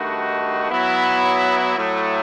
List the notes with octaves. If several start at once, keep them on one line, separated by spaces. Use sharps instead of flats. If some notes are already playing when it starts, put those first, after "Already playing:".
Already playing: G2 D#3 A3 D#4 F#4
F#3 B3 E4
A2 F#3 A3